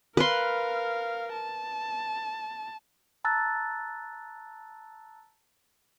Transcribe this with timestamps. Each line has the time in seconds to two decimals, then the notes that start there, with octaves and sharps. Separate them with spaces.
0.17 A#4 B4 F5 C6
1.33 A5
3.24 A5 A#5 E6 F#6 A6